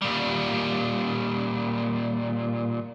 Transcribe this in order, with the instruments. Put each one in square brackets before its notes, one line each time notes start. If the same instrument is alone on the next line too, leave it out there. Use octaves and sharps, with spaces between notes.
[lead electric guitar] A#2 G3